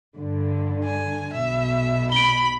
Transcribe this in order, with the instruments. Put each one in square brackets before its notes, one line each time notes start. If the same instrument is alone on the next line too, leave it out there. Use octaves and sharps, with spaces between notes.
[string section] G2 D3
[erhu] G#5
[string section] B1 B2 [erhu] E5
[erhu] B5 [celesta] D7 G7